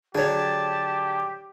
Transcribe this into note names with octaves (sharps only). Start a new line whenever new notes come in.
D3 F#3 G4 G#4 C#5 A5